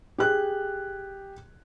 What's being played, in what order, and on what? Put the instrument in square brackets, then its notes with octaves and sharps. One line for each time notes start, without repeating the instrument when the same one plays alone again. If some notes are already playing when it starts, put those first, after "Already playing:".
[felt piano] G4 G#4 F#6